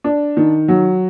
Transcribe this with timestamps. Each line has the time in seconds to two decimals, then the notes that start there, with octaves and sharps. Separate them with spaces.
0.04 D4
0.37 D#3
0.68 F#3